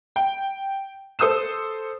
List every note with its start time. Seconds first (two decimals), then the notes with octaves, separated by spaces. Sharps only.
0.16 G5
1.19 A4 C5 D#6 E6 E7